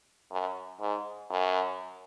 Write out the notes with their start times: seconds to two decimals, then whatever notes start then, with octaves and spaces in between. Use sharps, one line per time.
0.31 F#2
0.81 G#2
1.30 F#2